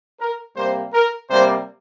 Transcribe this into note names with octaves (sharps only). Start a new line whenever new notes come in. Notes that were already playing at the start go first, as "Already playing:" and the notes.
A#4
C3 G3 A#3 C5
A#4
C3 G3 A#3 C5